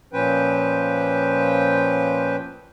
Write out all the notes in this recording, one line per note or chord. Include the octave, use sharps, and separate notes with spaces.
A#2 F3 C#4 B4 C5 G5